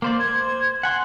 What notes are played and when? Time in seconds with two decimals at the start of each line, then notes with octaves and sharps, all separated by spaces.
0.02 A#3 C5 D5
0.20 C5 G#6
0.83 F#5 G#5 C6 F#6